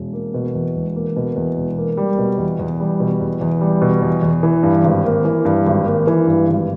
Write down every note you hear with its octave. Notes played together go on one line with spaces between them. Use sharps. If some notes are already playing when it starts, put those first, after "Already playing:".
Already playing: E1
A#3
B2
E2
E1
A#3
B2
E2
E1
A#3
G3
B2
E2
E2
G3
B2
E2
E2
G3
B2
E2
E2
E3
G2
G#1
A#3
E3
G2
G#1
A#3
E3
G2
G#1